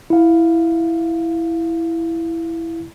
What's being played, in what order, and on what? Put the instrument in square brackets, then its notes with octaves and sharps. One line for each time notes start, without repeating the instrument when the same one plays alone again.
[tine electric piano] E4 F5